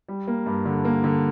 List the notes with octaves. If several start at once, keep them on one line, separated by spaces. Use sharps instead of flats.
G3
A#3
G2
D3
A#3
D3